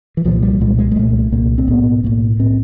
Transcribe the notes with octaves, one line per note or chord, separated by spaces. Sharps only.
E3
C2 A#2 F3
G3
C2 A#2 G#3
G#3
G#3
C2 A#2 A3
C2 A#2 A#3
C4
B1 A2 B3
B1 A2 A#3
A2 C4